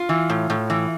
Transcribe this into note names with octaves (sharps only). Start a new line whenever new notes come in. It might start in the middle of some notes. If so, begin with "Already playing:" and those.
Already playing: F4
E3
A2
A2
E3